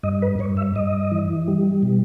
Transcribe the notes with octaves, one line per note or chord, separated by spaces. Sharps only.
G2 D#5
B4
G2 C#5
E5
G2 D#5
E3
G3
B2